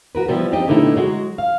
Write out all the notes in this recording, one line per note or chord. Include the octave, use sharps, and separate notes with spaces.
F#4 A#4 B4
F3 G3 B3 E4
F2 C4 D#4 G4 D#5
A#2 D3 A3 B3 D#4 E4
F#3 G#3 F#4
F5